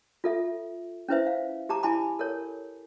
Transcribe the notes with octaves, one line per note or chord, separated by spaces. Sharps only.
F4 A4 E5
C#4 E4 B4 C5 E5
F5
G4 A5 A#5 D6
E4 G#5 A5 B5 D6
A4 A#4 C#5